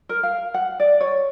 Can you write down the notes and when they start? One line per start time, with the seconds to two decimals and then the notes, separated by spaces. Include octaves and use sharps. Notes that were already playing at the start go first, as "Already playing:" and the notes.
0.09 A#4
0.23 F5
0.54 F#5
0.80 D5
1.01 C#5